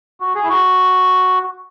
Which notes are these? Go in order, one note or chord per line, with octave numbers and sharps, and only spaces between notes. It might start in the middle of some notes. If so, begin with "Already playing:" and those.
F#4
G#4
E4
F#4